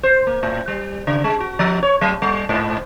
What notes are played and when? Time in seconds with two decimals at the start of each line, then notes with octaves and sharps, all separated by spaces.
0.03 C5
0.27 A#3
0.43 A2
0.68 G3
1.07 C#3
1.24 G#3
1.40 F#4
1.59 F3
1.83 C#5
2.01 F#3
2.22 G3
2.49 G#2